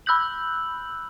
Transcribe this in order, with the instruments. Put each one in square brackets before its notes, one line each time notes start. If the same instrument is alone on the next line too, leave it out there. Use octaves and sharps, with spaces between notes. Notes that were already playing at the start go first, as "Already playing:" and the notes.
[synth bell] B5 E6 F#6 G6 F#7